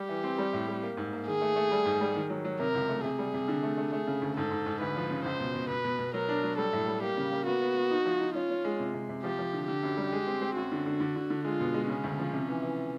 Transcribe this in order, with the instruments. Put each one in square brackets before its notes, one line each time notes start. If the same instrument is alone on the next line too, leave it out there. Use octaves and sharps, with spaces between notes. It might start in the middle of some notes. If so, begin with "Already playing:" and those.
Already playing: [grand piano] G3 [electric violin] G4
[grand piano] E3
C4
G3
A2
G3
A#3
G#2
A#3
[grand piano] D#3 [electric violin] G#4
[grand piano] A3
A3
G3
G#2
G3
D#3
F#3
F#3
[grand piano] C3 [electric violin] A#4
[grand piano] C#2
A3
[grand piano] C3 [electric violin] G#4
[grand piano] G3
C3
D3
A3
A3
[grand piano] A3 [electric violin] G#4
[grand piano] C#3
D2
[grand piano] G#2 [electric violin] A4
[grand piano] G#2
G#2
[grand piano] D2 [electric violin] B4
[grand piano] F3
C#3
[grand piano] C#2 [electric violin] C5
[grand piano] B2
B2
[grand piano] B2 [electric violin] B4
[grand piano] B2
B2
[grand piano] F#3 [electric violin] A#4
[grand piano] D4
F#3
[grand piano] G3 [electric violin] A4
[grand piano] A2
G3
[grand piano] A#3 [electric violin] G4
[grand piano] C#3
A#3
[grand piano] B3 [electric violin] F#4
[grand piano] B3
B3
D#4
F3
D#4
[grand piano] C#4 [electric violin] F4
[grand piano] C#4
G#3
C3
C3
C3
[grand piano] F3 [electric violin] G4
[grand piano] F3
D3
[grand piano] D3 [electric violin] G4
[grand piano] F#2
G3
G#3
C4
C4
[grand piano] F#2 [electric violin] F#4
[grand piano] D3
D3
D3
D3
D3
[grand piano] G#3 [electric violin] F4
[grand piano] B2
G#3
[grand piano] C#3 [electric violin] C#4
[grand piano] D2
F3
C3
E3
E3